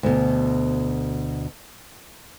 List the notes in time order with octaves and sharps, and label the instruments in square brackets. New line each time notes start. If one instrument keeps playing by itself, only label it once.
[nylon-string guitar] D2 B2